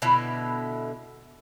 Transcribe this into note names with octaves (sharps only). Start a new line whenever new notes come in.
B2 D3 E4 E5